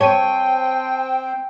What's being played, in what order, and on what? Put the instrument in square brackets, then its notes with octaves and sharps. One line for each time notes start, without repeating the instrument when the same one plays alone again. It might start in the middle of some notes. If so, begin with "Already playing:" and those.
[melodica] C4 C5 [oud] C#5 [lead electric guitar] G5 [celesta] A5 D#7